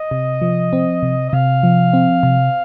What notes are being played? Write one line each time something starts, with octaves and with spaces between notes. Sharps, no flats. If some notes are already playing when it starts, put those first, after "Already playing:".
Already playing: D#5
C3
F3
C4
C3
D#5
C3 F5
F3
C4
C3